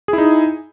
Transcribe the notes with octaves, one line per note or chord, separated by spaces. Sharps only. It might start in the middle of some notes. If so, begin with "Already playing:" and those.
D#4 E4 G#4